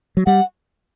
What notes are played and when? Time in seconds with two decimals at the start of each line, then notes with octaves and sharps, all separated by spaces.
0.17 F#3
0.26 G3 F#5